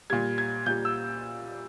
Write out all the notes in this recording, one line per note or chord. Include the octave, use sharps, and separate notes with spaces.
A#2 G3 G#6
G#6
A#2 G3 G6
E6